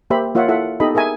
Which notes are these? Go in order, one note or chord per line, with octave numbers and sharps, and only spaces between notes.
A#3 G4 C5 E5 B5
A#3 F4 C#5 E5 F#5
E4 F4 A4 E5 F#5
B3 D#4 G4 A4 D#5 B5
G#4 A#4 E5 G#5